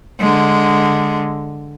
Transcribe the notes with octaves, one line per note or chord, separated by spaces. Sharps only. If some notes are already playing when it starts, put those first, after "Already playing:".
D3 G#3